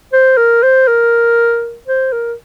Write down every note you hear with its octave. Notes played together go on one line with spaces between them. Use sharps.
C5
A#4
C5
A#4
C5
A#4